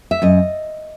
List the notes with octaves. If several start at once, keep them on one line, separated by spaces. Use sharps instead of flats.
E5
F#2 D#5